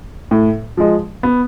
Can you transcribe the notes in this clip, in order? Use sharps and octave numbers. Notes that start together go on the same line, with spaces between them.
A2
F3 G#3
B3